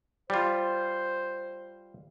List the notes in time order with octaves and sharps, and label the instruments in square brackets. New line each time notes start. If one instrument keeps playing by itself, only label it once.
[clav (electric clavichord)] G3 F4 [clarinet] C5